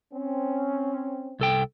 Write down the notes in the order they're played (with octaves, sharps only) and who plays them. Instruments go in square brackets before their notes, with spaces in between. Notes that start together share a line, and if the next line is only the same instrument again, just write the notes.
[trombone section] C4 C#4
[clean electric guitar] C2 A4 G5